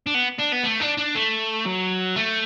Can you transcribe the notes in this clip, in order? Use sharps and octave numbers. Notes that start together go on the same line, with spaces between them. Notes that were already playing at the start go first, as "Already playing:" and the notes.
D4
B3
D4
B3
A3
D4
D4
A3
F#3
A3